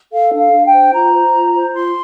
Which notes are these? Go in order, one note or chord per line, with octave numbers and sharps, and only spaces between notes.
A4 F5
D4
F5
D4
G5
C5
F4 A#5
C5
F4
C5
F4 C6